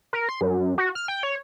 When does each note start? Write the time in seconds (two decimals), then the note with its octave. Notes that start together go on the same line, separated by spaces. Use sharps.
0.13 A#4
0.29 C6
0.41 F#2
0.78 F#4
0.95 F6
1.08 G5
1.23 C#5